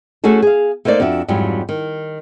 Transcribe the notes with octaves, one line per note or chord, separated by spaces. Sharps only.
A3 C#4 F#4 G#4 A4
G#4 F5
A3 A#3 D#4 C5 D5
F2 D4 F#4 E5
F2 G#2 F#3 G3
D#3